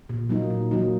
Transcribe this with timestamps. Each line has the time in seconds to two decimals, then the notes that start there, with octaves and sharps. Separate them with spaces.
0.09 A#2
0.29 F#3 A#3 D#4
0.50 A#2
0.71 F#3 A#3 D#4